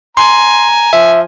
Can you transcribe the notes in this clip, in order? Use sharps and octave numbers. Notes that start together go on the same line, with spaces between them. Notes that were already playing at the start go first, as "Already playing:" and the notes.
G#5 A#5 C6
F3 E5